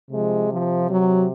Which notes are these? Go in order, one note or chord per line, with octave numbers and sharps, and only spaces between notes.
C3 F3 G#3
F3
F#3